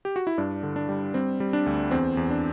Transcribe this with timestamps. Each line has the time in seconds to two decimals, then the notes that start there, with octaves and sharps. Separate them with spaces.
0.05 G4
0.16 F#4
0.27 E4
0.38 G2 D4
0.63 D3
0.76 D4
0.89 G3
1.14 G3 C4
1.40 G3
1.53 D4
1.66 D2
1.91 E2 C4
2.17 E2
2.30 D4